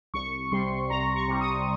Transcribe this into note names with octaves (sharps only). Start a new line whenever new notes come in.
C2 C#6
C3 G3 C6
C2 A#5
C#6
C3 G3
D#6